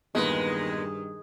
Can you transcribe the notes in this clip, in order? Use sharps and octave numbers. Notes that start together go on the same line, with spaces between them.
E2 G2 A#2 D#3 G#3 B4